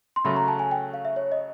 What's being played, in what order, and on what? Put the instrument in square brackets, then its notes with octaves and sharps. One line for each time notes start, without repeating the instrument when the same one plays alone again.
[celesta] C6
[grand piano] C#3 F#3 A3 [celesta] B5
[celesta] A#5
A5
G#5
G5
F5
E5
C#5
D#5